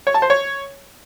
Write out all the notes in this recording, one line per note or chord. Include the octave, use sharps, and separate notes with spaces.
C#5
A5
C5
C#5